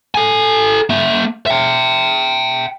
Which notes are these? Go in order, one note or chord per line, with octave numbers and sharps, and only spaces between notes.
A4 G#5
A#3 E5
E5 G5